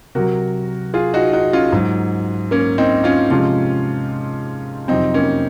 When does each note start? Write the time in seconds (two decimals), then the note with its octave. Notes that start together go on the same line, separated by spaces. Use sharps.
0.15 C3 F#3 F#4 A#4
0.94 F4 G#4
1.14 D#4 F#4
1.33 D#4 F#4
1.53 C#4 F4
1.72 G#2 F#3
2.51 A#3 C#4
2.78 C4 D#4
3.04 C#4 F4
3.30 C3 F3 G#3 C#4 F4
4.88 F2 C3 F#3 C4 D#4
5.14 A#3 C#4